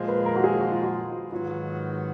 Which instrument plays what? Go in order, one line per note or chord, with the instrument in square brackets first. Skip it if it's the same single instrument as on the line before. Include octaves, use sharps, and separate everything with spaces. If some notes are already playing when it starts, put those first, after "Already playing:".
Already playing: [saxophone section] A#2 F3 G#3
[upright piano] B4
A#4
F#4
G#4
F#4
F4
F#4
[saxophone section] G#2 D#3 F#3 B3 [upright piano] F4